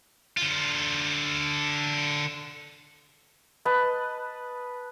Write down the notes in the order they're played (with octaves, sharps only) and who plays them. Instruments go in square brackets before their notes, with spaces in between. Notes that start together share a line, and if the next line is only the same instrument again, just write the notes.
[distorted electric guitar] D3 F4
[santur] B4 D#5 A5